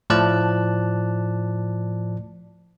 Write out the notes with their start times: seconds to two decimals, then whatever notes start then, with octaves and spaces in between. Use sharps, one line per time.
0.10 A2 F3 D5 A5 F#6